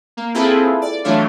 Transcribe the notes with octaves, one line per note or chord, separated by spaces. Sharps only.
A#3
C4 E4 F4 G#4 A4 B4
D5
E3 F#3 A3 D4 F4 C#5